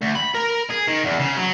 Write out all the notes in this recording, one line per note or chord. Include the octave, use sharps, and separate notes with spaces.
D2
B5
A#4
G#4
D#3
E2
C#3
F#3